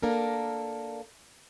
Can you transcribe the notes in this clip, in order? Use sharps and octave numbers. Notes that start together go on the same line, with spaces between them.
A#3 D4 A4 A#4